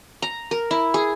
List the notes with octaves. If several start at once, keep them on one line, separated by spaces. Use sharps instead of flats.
A#5
A#4
E4
G#4